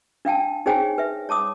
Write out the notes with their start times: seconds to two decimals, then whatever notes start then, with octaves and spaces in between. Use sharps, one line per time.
0.25 D4 F5 G5 A5
0.66 D#4 G#4 C5 C#5 G5 G#5
0.98 B4 E5
1.29 C#5 A5 D6 D#6